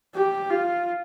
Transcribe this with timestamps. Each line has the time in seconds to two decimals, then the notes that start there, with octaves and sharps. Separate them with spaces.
0.14 G4
0.50 F4